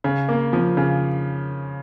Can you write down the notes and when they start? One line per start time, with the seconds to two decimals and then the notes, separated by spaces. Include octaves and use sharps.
0.04 C#3
0.29 A#3
0.53 F3
0.77 C#3